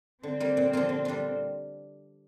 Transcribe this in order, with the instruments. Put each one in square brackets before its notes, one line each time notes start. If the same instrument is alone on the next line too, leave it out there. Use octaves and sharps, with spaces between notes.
[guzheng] D3 [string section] C4
[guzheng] G3 A#3 F4
A#2
F3 A#3 F4
D3
G3 D4 F4